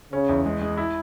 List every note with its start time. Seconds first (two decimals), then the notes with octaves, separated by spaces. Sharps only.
0.13 C#3 C#4
0.29 E2
0.46 G#3
0.61 G#3
0.77 E4